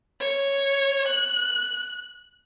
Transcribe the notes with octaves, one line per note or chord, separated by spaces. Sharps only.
C#5
F#6